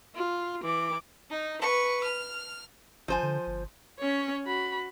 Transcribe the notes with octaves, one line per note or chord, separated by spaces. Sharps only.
F4
E3 D6
D#4
B4 C#6
F6
G1 F3 C5 G#5
D3
G1
C#4 C#5
F#4 B5